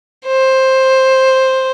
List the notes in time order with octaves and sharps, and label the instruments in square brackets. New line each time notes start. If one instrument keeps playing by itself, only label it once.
[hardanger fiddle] C5